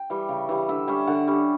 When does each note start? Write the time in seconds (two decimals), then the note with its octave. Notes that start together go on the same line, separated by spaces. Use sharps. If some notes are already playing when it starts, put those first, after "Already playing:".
Already playing: G5
0.10 E3 G3
0.29 C#3
0.49 E3 G3
0.69 D3 E5
0.87 G3 C#4 E5
1.07 D3 F#5
1.27 G3 C#4